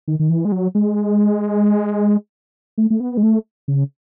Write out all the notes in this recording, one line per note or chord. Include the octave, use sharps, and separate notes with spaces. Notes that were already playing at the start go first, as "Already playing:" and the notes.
D#3
D#3
E3
G#3
F#3
G#3
A3
A3
B3
G#3
A3
C#3